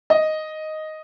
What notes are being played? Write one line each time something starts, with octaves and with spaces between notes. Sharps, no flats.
D#5